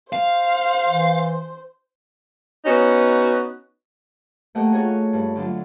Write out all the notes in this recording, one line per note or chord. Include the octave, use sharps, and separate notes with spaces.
C5 F5
E3
B3 C#4 D#4 F#4
A3 A#3 G4 D#5 F#5
F4 F#4 G#4 A4 C#5
G2
D3 F#3 A3 D4 F4